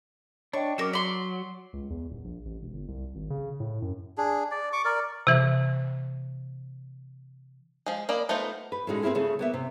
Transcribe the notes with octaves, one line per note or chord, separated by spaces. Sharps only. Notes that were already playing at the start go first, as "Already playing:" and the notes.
D4 C#5 D#5 G5 C#6
F#3 C#4 A#4 D6 E7
D5 C6 B6 G7
C#2
E2
D#1
A#1
A1
E1
G1
C2
G#1
C#3
A2
F#2
D4 G#4
D5
C#6 D6
A#4 D5
C3 E3
F3 G#3
A#3 D5 D#5 B5
A3 B3 D#4 F4 C5
B4
A2 G#3 C#4 D#4 F4 F#4
A#3 C4 D4 E4 F4 G#4
C#3 A3 G#4
A#3 B3 E5
C3